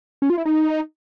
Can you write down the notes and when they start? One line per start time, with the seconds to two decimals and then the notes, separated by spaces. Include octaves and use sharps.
0.22 C#4
0.30 F4
0.38 E4
0.45 D#4